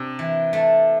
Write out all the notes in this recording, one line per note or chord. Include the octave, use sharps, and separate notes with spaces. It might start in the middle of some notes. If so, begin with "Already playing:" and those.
Already playing: C3 D4
E3
A3